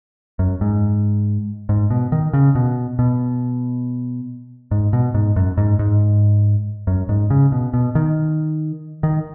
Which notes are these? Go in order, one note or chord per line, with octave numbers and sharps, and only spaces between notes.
F#2
G#2
G#2
B2
D#3
C#3
B2
B2
G#2
B2
G#2
F#2
G#2
G#2
F#2
G#2
C#3
B2
B2
D#3
D#3